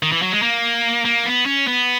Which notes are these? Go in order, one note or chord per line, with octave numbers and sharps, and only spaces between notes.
D#3
E3
F#3
G#3
A#3
A#3
B3
C#4
B3